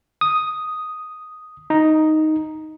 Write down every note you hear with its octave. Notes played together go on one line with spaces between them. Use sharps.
D#6
D#4